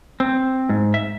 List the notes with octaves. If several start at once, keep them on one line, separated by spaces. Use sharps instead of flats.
C4
G#2
E5